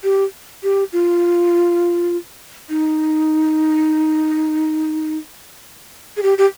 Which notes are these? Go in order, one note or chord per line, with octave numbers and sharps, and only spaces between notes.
G4
G4
F4
D#4
G#4
G4
G4